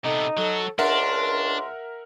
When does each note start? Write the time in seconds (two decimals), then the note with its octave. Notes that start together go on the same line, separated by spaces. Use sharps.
0.05 C3 B3 D#4 A4
0.37 F#3 F#4 A4
0.79 C#2 D4 A#4 E5 F#5 C6